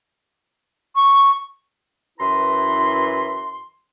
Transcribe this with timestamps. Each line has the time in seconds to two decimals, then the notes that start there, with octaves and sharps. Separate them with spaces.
0.96 C#6
2.18 F#2 E3 E4 B4 A#5 C6